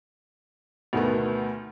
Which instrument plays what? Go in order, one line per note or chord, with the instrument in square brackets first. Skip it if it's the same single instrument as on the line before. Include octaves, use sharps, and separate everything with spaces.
[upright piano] D2 B2 D#3 A3 B3